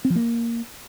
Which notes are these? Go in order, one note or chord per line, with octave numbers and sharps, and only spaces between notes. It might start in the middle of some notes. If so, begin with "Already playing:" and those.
C4
F3
A#3